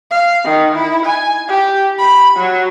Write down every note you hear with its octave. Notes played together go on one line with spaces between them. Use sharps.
F5
D#3
E4
G#5
G4
B5
F#3